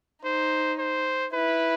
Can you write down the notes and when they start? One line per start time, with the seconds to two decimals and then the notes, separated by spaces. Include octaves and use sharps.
0.24 D#4 C5
0.79 C5
1.33 E4 B4